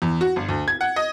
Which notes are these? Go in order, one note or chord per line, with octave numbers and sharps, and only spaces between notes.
E2
F#4
G1
D2
G#6
F#5
D#5